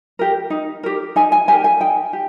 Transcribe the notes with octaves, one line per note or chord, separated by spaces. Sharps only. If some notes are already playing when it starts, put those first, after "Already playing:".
G4 A#4
D#4
G4 A#4
D#4 G#5
G#5
G4 A#4 G#5
G#5
D#4 G5
G4